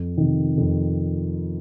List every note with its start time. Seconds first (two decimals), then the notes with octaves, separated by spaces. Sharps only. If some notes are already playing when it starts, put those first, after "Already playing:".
Already playing: F2
0.17 C3 D#3
0.58 F2